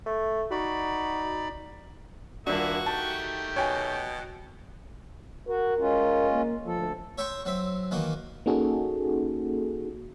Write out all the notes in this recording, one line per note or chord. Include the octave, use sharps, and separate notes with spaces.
A3
D#4 F#4 D5 B5
D#1 A#3 D4 E4 F#4 E5
D#3 A3 G4 A5
B2 C#5 G5 G#5
F#4 A#4
G#3 C#4 F4
A#3
D2 F3 A4
C#5 E5 G5 A#5 C6 C#6
F#3 C4 E5
D#3 E3 A#3 F#4
A#3 C#4 D#4 F#4 G#4 A4